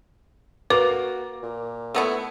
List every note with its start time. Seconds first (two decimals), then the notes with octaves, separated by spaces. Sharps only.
0.70 A#3 F#4 B4 D6
1.42 A#2
1.95 A3 B3 E4